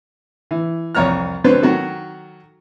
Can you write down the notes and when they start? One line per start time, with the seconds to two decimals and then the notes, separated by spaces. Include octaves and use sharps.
0.51 E3
0.95 C2 F2 C#5 A#5 F6
1.44 D3 F#3 C4 B4 C5
1.62 D#3 F#3 F#4 A4